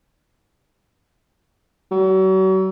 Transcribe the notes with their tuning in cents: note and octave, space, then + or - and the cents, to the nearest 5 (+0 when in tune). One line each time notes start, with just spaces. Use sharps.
F#3 +40